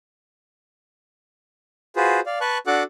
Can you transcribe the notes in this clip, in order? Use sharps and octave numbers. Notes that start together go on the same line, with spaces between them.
F4 F#4 G#4 B4 C5
D5 F5
B4 A5 C#6 F#6
D4 F#4 A4 F#5 D6 F#6